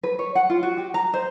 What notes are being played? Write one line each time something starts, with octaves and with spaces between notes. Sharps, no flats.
B4
C#5
F#5
F4
F#4
G4
A#5
C5